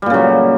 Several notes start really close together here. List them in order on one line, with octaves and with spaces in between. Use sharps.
G3 A#2 C#3 F#3